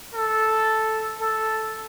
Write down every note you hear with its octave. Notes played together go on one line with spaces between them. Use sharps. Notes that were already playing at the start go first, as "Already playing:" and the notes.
A4
A4